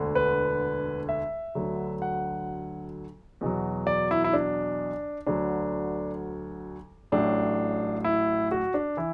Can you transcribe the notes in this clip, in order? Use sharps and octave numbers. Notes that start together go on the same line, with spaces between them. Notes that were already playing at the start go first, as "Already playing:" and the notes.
Already playing: E1 D2 D3
B4
E5
D2 D3 F#3
F#5
E2 B2 F#3
D5
E4
E4
D4
D2 D3 F#3 D4
A1 A2 F#3 D4
E4
F#4
D4
E3 E4